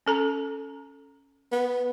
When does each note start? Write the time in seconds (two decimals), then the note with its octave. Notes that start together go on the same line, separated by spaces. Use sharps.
0.06 C#4 A4 A#5
1.52 B3